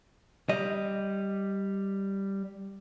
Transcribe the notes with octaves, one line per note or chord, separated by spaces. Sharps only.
G3 D#5